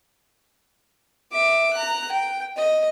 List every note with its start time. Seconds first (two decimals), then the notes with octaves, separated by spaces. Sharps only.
1.32 E5 D6
1.73 A#5 F#6
2.12 G5
2.57 D#5